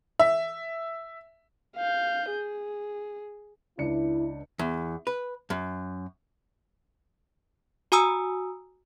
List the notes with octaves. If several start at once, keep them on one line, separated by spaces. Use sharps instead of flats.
E5
F5 G6
G#4
C#2 D4 E4 C#7
E2
B4
F#2
F#4 G#5 A#5 D#6 E6